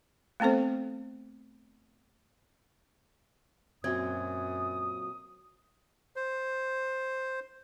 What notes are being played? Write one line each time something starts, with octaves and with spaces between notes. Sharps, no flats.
A3 B3 C4 A4 C5
F#2 A#2 F#3 C4 F#4 D#6 G#6
C5